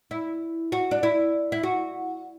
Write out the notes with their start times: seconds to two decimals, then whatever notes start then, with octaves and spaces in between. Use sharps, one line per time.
0.11 E4
0.72 F#4
0.91 D4
1.03 E4
1.52 E4
1.63 F#4